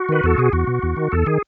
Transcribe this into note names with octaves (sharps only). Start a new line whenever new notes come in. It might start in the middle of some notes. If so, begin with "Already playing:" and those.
Already playing: F#4
D#3 B4
E2 A4
B2 G#4
E2 F#4
B2
E2
D#3
E2 A4
D#3 G#4